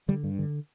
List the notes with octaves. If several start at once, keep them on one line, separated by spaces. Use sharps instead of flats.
D3 G3
G2
D3